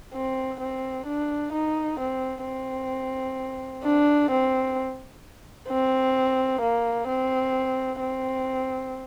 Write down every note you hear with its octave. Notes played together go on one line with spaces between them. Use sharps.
C4
C4
D4
D#4
C4
C4
D4
C4
C4
A#3
C4
C4